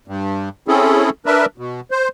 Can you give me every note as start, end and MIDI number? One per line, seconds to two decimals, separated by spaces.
0.08 0.49 43
0.68 1.10 60
0.68 1.10 61
0.68 1.10 64
0.68 1.10 68
0.68 1.10 69
1.26 1.46 62
1.26 1.46 70
1.26 1.46 71
1.26 1.46 76
1.58 1.80 47
1.91 2.08 72